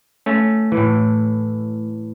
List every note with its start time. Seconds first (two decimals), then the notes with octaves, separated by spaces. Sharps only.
0.26 A3 C#4
0.72 E3
0.77 A2